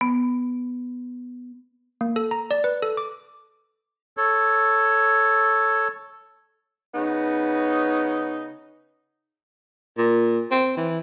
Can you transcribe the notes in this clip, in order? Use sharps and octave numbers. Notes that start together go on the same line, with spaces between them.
B3
A#3
A4
A#5
D5
B4
A4
D6
A4 C#5
C#3 B3 D#4
A#2
C4
E3